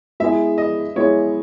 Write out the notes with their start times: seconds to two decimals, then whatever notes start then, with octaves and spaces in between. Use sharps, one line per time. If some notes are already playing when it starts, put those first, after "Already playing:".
0.20 G#3 B3 E4 G#4 E5
0.58 D#5
0.96 G#3 B3 E4 G#4 C#5